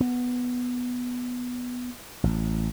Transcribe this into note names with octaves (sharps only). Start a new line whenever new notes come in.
B3
A1